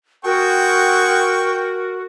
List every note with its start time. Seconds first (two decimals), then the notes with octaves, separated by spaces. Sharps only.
0.25 C4 F#4 G#4 A#4 F#5 G5 C#6